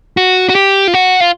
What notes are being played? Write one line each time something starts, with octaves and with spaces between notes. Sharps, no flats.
F#4
F#4
G4
F4
F#4
F4